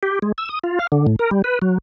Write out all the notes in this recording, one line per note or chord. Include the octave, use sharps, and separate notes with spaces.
G4
G#3
E6
D#6
F4
F5
D3
A2
A#4
G3
B4
F#3